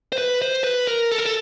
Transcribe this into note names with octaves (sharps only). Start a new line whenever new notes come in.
C5
B4
C5
B4
A#4
A4
A#4
A4